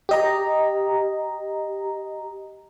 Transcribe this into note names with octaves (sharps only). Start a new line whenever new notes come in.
G4 D#5 A#5